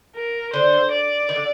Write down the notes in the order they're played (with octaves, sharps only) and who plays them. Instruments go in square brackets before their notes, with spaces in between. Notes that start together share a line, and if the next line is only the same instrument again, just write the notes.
[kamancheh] A#4
[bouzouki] D3 [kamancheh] C5
[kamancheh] D5
[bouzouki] D#3
D3